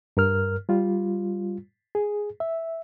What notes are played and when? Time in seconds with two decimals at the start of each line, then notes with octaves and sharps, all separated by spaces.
0.17 G2 A#4 F6
0.69 G3 F4
1.95 G#4
2.40 E5